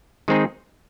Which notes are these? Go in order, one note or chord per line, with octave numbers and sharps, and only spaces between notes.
D#3 G#3 C4 D#4 G#4